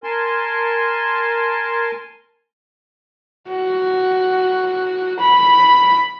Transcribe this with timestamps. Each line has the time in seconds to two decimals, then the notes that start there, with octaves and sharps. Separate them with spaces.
0.04 A#4 G#5 A5 C6
3.49 F#4
5.20 B5